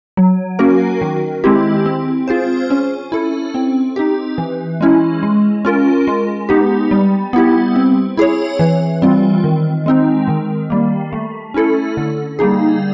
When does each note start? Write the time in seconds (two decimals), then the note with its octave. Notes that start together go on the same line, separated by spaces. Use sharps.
0.17 F#3
0.59 A#3 C#4 F#4 A#4
1.01 D#3
1.44 G#3 C4 E4 G4
1.86 C4
2.28 F4 G#4 C5
2.70 C#4
3.12 E4 A4
3.54 C4
3.96 D#4 G4
4.38 E3
4.81 G#3 C#4 E4
5.23 G#3
5.65 C#4 F4 A#4
6.07 G#3
6.49 B3 D#4 G4
6.91 G3
7.33 B3 E4 G4
7.76 C4
8.17 E4 G#4 C#5
8.59 E3
9.02 G3 C4 F4
9.44 D#3
9.86 G#3 C4 D#4
10.28 D#3
10.70 G3 A#3
11.13 A3
11.54 C#4 E4 A4
11.97 D3
12.39 G3 A#3 D#4 G#4